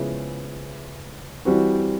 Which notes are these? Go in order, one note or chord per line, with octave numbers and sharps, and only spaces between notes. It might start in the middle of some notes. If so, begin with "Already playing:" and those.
Already playing: C#3 F3 G#3 B3 E4
E3 G3 C4 F#4